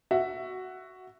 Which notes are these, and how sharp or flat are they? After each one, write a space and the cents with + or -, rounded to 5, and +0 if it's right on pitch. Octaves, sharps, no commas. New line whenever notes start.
F#4 +0 E5 +10